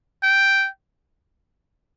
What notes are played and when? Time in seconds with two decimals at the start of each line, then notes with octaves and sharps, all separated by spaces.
0.23 G5